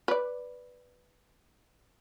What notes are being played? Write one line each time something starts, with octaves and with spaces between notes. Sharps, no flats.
B4 D5